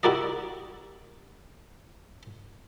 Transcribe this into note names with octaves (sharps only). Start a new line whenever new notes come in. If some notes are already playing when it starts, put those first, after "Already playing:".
E4 F#4 G4 A#4 D5 D#5